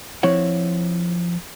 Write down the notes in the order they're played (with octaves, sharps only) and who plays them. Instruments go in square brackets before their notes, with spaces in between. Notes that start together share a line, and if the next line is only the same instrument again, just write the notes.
[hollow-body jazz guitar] F3 C4 E4 C#5 F#5